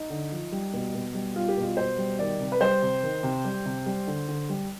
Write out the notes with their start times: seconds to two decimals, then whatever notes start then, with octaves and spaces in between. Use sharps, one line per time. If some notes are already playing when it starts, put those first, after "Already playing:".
Already playing: D#4
0.10 D3
0.32 F3
0.52 G3
0.73 B2
0.94 B2
1.14 G3
1.35 G3 F4
1.48 G4
1.57 B2
1.62 F4
1.77 B2 C5
1.98 G3
2.19 D#3 D5
2.40 C3
2.52 B4
2.61 G3 C5
2.82 C3
3.03 D#3
3.23 C3
3.45 G3
3.65 C3
3.86 G3
4.07 D3
4.28 D3
4.49 G3